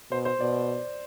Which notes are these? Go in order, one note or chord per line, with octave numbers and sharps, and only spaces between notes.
B2 C5
C5
B2 D5